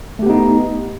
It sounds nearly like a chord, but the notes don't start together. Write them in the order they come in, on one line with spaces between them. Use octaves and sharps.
A3 G4 B3 D#4